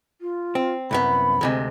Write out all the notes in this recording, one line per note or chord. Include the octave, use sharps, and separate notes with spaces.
F4
C4
C2 F#2 B3 B5
D2 C3 G#3